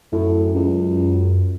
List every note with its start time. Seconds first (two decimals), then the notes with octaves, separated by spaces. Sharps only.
0.12 F#2 A2
0.55 C#2